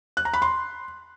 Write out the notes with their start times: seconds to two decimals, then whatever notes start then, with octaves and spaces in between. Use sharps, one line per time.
0.17 F#6
0.25 A#5
0.34 B5
0.42 C6